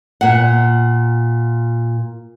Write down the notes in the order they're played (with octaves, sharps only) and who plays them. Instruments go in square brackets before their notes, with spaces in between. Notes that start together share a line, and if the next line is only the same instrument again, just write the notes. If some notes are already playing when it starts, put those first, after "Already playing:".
[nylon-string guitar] A#2 F#5